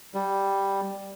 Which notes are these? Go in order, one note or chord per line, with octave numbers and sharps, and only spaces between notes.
G3